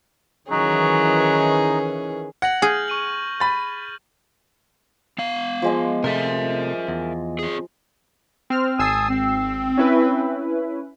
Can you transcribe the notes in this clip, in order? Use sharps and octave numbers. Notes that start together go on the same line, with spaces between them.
D#3 E3 F#3 C#4 D#4 G#4
F#5 G#6 A#6 F#7
G#4 F6 G6
C#6 D#7 F#7
B5 A6
B3 F5
F3 G#3 D#5
C3 A3 A#4 E5
E2
C4 G#4
C4 F6
G#1 G#5 A5 D#6 E6 C7
C4
C#4 E4 B4